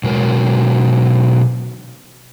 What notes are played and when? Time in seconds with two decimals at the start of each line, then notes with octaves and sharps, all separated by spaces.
0.04 B2 F#3 G#3 A#4